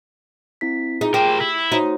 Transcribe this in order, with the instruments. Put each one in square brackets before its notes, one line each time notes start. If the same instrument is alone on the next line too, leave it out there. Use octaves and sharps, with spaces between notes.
[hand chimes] C4 E4 B6
[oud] D#4 [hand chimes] F4 G#4
[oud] G4 [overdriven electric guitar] A#4 C5
[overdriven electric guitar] E4 [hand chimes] B6
[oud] D#4 [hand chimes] F#4 C5 C#5